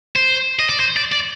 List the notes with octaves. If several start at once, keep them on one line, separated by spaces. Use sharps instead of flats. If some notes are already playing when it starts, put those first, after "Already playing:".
C5
D#5
D5
C5
D5
D5